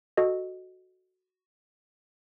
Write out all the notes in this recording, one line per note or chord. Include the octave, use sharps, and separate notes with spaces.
F#4 A4 D#5